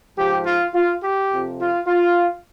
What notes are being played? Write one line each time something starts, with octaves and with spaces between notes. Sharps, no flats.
G#2 F3 G4
F4
F4
G4
F2 C3 F3
F4
F4